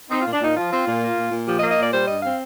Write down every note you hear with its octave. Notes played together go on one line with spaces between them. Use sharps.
C4 D#4
A#2 F4
D4
A#2 D#4
F3 F4
C4
A#2
A#3
A#2
A#2
F3 G4
D#5
A#3
D#5
A#2 D5
G3 C5
G2 D#5
C4 F5